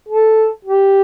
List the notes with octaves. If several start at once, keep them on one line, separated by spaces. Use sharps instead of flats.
A4
G4